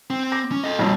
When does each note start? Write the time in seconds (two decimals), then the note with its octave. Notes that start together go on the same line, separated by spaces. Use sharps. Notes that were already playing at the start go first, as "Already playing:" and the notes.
0.10 C4
0.32 D6 A#6
0.52 C#4
0.64 A4 D#5
0.79 B1 F2 A#2 G3